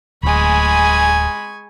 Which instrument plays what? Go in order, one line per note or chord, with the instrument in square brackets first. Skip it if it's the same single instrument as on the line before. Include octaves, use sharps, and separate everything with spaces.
[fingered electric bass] D1 [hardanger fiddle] G#3 B5 [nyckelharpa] G#5 C#6